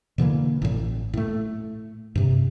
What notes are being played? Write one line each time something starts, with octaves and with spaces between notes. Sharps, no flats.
B2 D3 E3 A#3
A1 A2
A2 A3
G2 C3